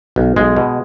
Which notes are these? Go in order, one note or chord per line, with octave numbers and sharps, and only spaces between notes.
B1
B1 G#3
B2